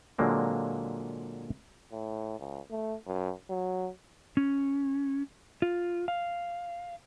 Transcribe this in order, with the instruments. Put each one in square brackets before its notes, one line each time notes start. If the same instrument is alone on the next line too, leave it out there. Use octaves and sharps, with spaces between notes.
[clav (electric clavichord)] A#2 D3 F#3 G#3 A#3 C4
[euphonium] A2
C#2
A3
F#2
F#3
[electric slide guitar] C#4
F4
F5